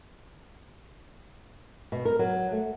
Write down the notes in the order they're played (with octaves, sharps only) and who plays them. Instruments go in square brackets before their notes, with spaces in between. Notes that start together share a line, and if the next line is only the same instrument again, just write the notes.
[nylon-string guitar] B2
A#4
F#3
A3